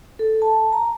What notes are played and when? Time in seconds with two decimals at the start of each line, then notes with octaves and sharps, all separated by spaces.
0.19 A4
0.42 A5
0.73 A#5